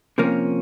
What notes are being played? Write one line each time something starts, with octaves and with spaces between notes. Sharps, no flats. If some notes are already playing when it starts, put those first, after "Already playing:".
C3 F3 A#3 C#4